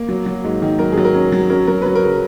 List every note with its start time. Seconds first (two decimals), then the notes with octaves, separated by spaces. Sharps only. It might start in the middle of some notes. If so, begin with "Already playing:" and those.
Already playing: A#3
0.09 F#3
0.26 F#3
0.44 G#2
0.62 D#3
0.79 F#3 A#4
0.92 G#4
0.97 F#3
1.05 A#4
1.14 C#4
1.32 F#3
1.50 C#4 A#4
1.67 F#3 A#4
1.82 F#3 B4
1.95 A#4
2.03 C#3